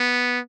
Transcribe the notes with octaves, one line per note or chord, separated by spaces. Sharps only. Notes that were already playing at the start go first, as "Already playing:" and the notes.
Already playing: B3